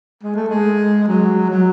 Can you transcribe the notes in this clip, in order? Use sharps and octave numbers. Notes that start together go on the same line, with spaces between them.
G#3
A3
G#3
F#3
F#3